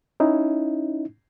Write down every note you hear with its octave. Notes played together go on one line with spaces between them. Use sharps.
C#4 D#4 E4